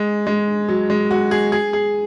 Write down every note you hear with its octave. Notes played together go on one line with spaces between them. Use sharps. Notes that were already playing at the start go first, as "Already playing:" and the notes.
Already playing: G#3
G#3
F#3
G#3
F#4
G#4
G#4
G#4